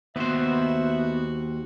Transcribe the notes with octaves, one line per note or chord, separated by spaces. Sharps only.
D#2 B3 F#4 C5 E5